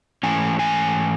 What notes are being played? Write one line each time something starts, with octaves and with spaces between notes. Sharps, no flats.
G#2 E3 A3 C#4 G#5
G#5